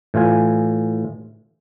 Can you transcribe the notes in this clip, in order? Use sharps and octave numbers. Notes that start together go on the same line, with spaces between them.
A2 E3 F4 G#5